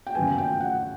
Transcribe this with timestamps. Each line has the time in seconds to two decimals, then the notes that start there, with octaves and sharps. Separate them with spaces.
0.07 G5
0.15 D#2 C#3 F#3 B3 G#5
0.38 G5
0.60 F#5